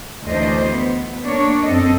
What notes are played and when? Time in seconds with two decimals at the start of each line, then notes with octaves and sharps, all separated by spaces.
0.24 D2 E3 D4 C5 D#5
0.61 B3
1.25 A#3 D4 C#5
1.63 F#2 C4 A4 D#5